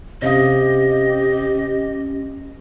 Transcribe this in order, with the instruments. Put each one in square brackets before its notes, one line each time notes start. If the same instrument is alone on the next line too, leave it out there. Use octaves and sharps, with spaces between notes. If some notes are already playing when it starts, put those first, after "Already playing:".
[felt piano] C3 F5 D#6 [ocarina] C#4 [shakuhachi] G4 [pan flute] D#5